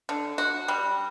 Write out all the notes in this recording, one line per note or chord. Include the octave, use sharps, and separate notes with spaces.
D3
F#4
G3